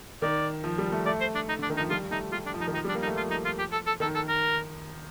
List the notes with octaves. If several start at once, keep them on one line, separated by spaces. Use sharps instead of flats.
D#3 D5
F3
G3
A3
A3 D5
C5
D4
D#4
D3 D4
D#3
D#4
F3
G3 F4
A3 D#4
G3 F4
D4
F3
D#4
D#3
F3 D#4
G3 D4
A#3
D#4
A3
F3 F4
D#4
F4
G4
A4
A4
D#3 A4
A4
A#4